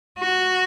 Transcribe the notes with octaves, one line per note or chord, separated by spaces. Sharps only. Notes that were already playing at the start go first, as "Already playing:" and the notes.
F#4